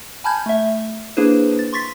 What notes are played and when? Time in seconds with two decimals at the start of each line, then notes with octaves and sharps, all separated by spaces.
0.24 G#5 A5 B5 F6 G6 G#6
0.46 A3 E5
1.17 A#3 D4 E4 G#4 B4 C5
1.59 A6
1.73 C6 C#6 A6 B6